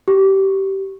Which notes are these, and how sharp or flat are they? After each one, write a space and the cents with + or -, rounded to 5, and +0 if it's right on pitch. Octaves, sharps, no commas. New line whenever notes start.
G4 -20